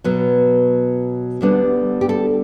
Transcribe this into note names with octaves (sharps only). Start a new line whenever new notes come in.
B2 F#3 B3
D2 D3 G3 B3 D4
G4
A4